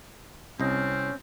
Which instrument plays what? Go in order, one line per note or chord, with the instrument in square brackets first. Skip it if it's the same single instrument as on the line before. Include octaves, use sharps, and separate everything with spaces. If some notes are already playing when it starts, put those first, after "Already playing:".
[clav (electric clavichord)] C2 D#5 [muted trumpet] C4 [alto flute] C#4